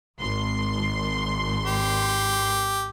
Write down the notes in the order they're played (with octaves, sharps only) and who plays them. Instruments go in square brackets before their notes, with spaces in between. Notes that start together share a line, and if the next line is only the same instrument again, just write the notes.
[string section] G#1 C6
[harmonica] G4